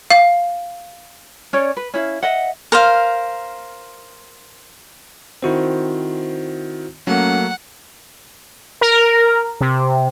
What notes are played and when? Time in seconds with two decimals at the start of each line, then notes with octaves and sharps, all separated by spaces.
0.11 F5
1.53 C#4 C#5 D5
1.77 B4
1.94 C#4 E4 F5
2.23 D#5 E5 F#5
2.72 A#4 C5 F5
5.42 D#3 C4 E4 F#4 C5
7.07 F#3 A3 A#3 C#4 F#5
8.81 A#4
9.61 C3